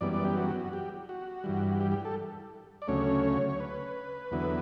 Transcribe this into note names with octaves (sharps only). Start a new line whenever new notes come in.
F#2 E3 G3 B3 D5
D5
G4
F#4
G4
F#4
G2 E3 G3
G4
G4
A4
D5
D2 C#3 F#3 A3 C#4 C#5
C#5
B4
E2 D3 F#3 B3 E4